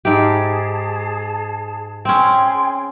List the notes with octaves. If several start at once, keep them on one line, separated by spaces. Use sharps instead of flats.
G#2 G4 G#4 A5
C4 C#4 G#4 G5 C6